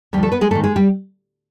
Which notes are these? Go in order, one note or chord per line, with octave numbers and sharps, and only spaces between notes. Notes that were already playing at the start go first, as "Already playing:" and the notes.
D2 D3 F3 G3 G4
A3 A4
B3 B4
G#3 G#4
G#2 D#3 A3 A4
G#3 G#4
G3 G4